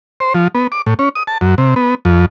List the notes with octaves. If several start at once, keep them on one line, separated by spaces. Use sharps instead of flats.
C5
F3
B3
D6
A2
C#4
D#6
A5
F#2
C3
B3
F2